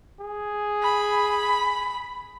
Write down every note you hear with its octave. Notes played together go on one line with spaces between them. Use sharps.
G#4
B5